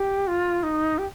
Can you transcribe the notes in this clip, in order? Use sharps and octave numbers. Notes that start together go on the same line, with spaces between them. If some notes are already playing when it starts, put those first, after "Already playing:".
Already playing: G4
F4
D#4
G4